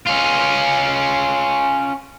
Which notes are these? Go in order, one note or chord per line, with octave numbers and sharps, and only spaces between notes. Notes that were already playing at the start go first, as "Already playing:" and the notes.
C#4 F4